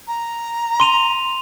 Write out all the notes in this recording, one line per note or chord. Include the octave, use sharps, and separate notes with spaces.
A#5
C6 D#7 F7